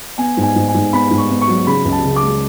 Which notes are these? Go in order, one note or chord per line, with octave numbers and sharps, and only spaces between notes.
B3 G#5
G#2
G#5
G#2
G#5
G#2
B3 B5
G#2
C#6
B3
C#6
F#3
C#3 B5
C#2
A5
C#3
D6
G#3